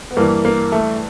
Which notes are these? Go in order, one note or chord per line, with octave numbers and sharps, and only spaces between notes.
B3
G2 E3 A#3
A#3
A3